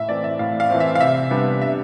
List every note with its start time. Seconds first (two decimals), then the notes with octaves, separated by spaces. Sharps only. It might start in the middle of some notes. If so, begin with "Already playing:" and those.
Already playing: A2 E5
0.09 E3 A3 C4 D5
0.24 E5
0.39 A2 F5
0.60 F5
0.70 E3 A3 C4
0.80 E5
0.95 F5
1.00 C3 E5
1.31 G3 B3 D4
1.62 C3 E5